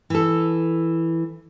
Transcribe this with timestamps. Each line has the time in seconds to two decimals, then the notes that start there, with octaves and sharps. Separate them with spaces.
0.10 E3 A4